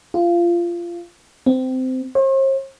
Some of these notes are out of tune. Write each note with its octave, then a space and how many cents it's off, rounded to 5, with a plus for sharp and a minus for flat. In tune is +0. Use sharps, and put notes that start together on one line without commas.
F4 -20
C4 -20
C5 +45